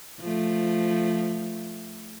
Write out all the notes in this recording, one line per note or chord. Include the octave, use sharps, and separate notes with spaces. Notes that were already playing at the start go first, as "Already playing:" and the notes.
F3 A3